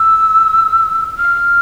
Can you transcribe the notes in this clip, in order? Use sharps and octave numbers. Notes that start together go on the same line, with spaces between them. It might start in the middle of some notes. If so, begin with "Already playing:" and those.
Already playing: E6
F6